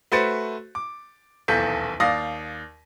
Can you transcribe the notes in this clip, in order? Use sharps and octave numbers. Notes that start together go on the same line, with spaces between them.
A3 F#4 B4 C5 A6 C#7
D6
D#1 B1 E2 A4 G6 B6
D#2 D5 F5 D#6 A#6